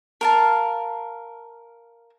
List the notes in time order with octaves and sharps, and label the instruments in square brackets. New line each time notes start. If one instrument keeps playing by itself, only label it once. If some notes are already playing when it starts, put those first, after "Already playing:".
[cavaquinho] A#4 F5 A5